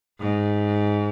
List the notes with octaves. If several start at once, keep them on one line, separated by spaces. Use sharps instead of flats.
G#2